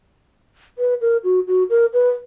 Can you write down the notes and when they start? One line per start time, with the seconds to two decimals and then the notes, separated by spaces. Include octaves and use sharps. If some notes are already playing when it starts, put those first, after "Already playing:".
0.78 B4
1.01 A#4
1.24 F#4
1.47 F#4
1.70 A#4
1.93 B4